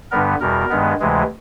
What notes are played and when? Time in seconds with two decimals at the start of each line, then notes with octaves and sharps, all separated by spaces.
0.11 G2 D3 G3 B3 A#4
0.40 E2 B2 G3 A#4
0.70 G2 D#3 G#3 B3
1.00 D2 C3 E3 G#3